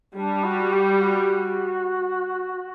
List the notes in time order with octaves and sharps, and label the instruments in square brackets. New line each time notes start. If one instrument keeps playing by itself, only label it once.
[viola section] G3 [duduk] D4
[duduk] F#4
G4
F#4